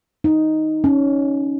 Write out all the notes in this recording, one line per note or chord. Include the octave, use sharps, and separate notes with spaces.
D#4
C#4